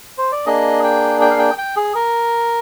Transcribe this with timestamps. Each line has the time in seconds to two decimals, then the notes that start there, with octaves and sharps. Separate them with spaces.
0.18 C5
0.32 D5
0.46 A#3 D4 G#4 D#5
0.84 G5
1.21 G5
1.31 F5
1.39 G5
1.58 G5
1.76 G#4
1.95 A#4